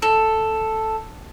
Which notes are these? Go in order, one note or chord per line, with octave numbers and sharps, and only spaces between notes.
A4